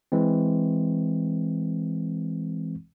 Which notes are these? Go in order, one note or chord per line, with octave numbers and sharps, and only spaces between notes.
E3 G#3 C4